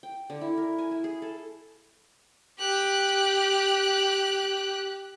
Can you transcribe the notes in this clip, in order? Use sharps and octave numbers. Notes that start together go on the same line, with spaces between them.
G5
D3
E4
A#4
G#5
E4
G#4
A4
G4 F#6